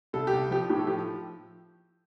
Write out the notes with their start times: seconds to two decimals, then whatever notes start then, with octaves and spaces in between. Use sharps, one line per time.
0.13 C2 A4
0.27 G4
0.33 C2
0.51 F3 G4
0.70 A2 G4
0.79 A4
0.87 F3 G4